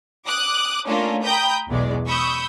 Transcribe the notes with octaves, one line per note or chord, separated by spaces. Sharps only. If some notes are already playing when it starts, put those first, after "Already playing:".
D6 D#6 F#6
A3 A#3 C#4 D4 F4 A4
G5 A#5 B5 D#6 G6
B1 E2 B2 G#3 D5
B5 C#6 D#6 E6 G6